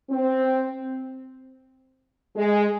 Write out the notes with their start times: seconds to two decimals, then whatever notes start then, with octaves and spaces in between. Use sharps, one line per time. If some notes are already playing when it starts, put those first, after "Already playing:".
0.10 C4
2.36 G#3